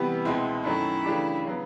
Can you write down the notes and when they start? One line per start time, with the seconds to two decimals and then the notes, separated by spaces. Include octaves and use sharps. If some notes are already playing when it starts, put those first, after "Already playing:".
Already playing: C3 E3 G3 B3
0.25 C#2 B2 G#3 C4 E4
0.65 F#2 D#3 F#3 A3 C#4 E4
1.05 C#3 E3 A3 D4 G4
1.45 C#3 F#3 B3